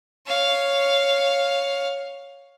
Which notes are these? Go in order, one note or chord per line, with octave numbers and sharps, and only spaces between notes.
C#5 F5